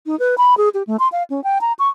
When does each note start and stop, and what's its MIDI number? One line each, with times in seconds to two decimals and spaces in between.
0.06 0.18 63
0.19 0.35 71
0.38 0.57 83
0.57 0.69 68
0.74 0.83 67
0.87 0.96 57
0.99 1.08 84
1.12 1.23 77
1.30 1.43 61
1.44 1.58 79
1.61 1.73 82
1.79 1.88 85